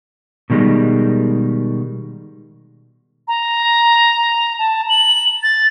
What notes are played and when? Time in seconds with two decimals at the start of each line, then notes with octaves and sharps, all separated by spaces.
0.50 B2 D#3 G3 G#3
3.28 A#5
4.59 A5
4.89 F#7
5.43 A6